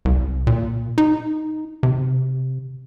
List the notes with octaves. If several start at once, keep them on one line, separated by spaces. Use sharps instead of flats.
C2
A#2
D#4
C3